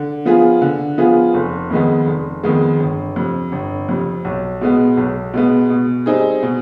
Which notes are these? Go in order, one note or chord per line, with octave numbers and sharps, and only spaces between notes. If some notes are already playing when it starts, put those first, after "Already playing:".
Already playing: D3
F3 B3 F4 G#4
D3
F3 B3 F4 G#4
F1
F2 D#3 G#3 B3
F1
F2 D#3 G#3 B3
G1
F2 C3
G1
F2 C3
B1
B2 G#3 B3
B1
B2 G#3 B3
B2
G3 C4 D#4 G#4
B2